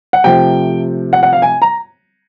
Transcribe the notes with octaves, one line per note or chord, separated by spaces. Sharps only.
F#5
C3 F3 A3 G5
F#5
F#5
F5
G#5
A#5